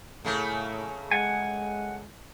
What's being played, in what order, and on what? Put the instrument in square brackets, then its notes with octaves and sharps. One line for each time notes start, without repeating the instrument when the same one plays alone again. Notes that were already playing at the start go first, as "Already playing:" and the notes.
[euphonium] A2 [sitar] C#3 A3 A#3
[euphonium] G#3 [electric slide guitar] F#5 G#5